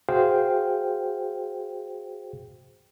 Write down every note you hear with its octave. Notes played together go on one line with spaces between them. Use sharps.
F#4 G#4 C5 F5 G5